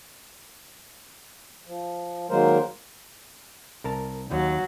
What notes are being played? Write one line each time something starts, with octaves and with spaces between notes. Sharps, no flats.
F3
D#3 F#3 G#3 A#3 A#4 C5
C2 A#4 A5
D#2 F#3